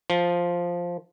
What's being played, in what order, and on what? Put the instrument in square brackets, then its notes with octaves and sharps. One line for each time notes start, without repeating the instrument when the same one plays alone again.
[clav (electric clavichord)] F3